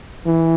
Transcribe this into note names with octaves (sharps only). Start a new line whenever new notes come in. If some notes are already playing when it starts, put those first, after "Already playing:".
E3